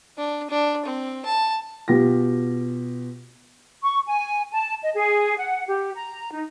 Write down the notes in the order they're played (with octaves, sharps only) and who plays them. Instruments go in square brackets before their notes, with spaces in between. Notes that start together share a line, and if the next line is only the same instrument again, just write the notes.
[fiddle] D4
D4
C4
A5
[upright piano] B2 F4 G4 A#6
[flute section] C#6
G#5
A5
D#5
G#4
F#5
G4
A#5
D#4